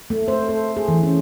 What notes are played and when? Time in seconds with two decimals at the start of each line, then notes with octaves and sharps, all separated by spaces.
0.10 A3
0.28 C5
0.49 A4
0.77 G#4
0.88 E3
1.03 C#4